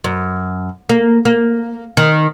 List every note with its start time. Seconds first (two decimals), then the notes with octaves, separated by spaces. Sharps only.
0.04 F#2
0.89 A#3
1.25 A#3
1.97 D#3